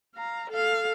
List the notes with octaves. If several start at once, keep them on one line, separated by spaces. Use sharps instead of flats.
F5 A#5
A4 F5